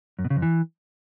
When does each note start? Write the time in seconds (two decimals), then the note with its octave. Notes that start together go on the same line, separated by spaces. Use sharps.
0.19 F#2
0.24 B2
0.30 C#3
0.36 F2
0.42 E3